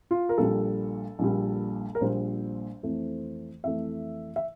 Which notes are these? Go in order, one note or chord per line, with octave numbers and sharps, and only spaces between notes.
F4
A#4
A#1 A#2 G3 A4
A#1 A#2 G3
A#4
A#1 A#2 G3 C5
F2 E3 A3
F2 E3 A3 E5
E5